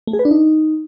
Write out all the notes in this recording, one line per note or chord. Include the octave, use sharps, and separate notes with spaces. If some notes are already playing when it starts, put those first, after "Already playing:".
A3
G#4
B4
D4
D#4